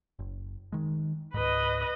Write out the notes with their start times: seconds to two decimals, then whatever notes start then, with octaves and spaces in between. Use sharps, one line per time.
0.19 F#1
0.72 D#3 G#3
1.34 C#2 G#2 B4 D#5